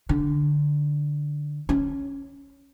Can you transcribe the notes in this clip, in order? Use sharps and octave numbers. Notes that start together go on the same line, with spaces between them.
D3
C#4